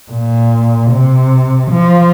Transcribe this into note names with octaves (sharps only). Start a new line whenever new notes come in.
A#2
C3
F3